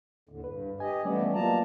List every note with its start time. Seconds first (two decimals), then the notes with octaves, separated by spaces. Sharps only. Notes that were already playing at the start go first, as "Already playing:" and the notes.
0.29 D#2 A2 D3
0.44 G2 B4
0.80 G4 D#5 G#5
1.05 E3 G3 A3 B3 C#4 D5
1.34 F#3 A#3 F4 D5 A5 A#5